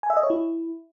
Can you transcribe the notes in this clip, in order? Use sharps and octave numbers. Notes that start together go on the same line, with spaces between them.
G#5
E5
D#5
C#5
E4